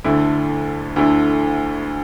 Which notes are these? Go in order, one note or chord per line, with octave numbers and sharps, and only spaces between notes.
D2 D3 A3 E4
D2 D3 A3 E4